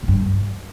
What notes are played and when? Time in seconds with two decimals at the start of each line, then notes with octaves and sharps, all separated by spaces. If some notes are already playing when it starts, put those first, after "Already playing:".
0.03 A2
0.08 G2